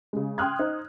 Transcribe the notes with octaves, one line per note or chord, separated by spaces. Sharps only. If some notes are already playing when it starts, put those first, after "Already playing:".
C#3 G#3
G5 C6 D#6 F6 F#6 G#6
D#4 C5